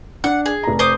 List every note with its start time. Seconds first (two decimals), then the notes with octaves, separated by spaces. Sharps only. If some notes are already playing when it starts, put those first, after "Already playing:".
0.24 D4 F#5
0.46 G#4
0.63 F1 A#5
0.79 C5 D6 D#6